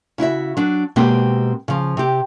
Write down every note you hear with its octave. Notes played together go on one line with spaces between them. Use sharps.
C#3 E4 F#4 E5
F#3 D4
B2 G#3 A#3 C4 G4
C#3 F3
C3 G4